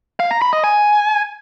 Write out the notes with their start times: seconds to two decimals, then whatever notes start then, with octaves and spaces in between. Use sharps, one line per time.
0.20 F5
0.31 A#5
0.42 B5
0.53 D#5
0.64 G#5